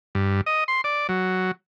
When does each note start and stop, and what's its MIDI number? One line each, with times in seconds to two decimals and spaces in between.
0.15 0.41 43
0.46 0.64 75
0.68 0.81 84
0.84 1.07 74
1.09 1.51 54